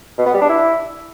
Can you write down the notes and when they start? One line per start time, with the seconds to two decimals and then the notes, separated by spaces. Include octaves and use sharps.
0.18 B2
0.26 B3
0.34 G3
0.42 D4
0.49 E4